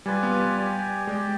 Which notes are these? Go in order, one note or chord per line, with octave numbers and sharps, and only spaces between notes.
G3 F4 B4 D5 G#5
B3
G3
G4 D5 G#5
G#3 G4 D5 G5